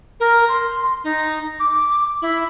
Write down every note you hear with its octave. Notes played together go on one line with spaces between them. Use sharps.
A#4
C6
D#4
D6
E4